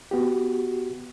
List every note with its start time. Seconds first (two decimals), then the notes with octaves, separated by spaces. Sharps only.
0.11 B3 F#4 G4